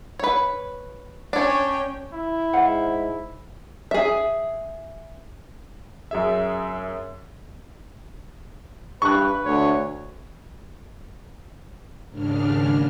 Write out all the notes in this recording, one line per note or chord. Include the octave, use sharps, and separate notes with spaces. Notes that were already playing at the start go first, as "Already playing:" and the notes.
B4 C#5
C#4 D4 C#5 G5
E4
G#2 C5 F5 F#5
G#4 E5
F#2 G#4 E5
G2 B4 C#6 F#6
D2 C#5
D#2 G#2 C#3 D4 F6